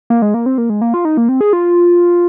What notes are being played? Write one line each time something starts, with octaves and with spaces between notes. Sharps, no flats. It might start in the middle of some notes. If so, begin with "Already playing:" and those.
A#3
G#3
A#3
C4
A#3
G#3
A#3
F4
D#4
A#3
C4
G#4
F4